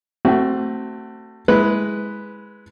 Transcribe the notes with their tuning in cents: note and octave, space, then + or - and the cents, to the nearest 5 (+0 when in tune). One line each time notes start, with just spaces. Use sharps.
A3 +20 C4 +5 F#4 +25
G#3 +0 E4 -20 B4 +0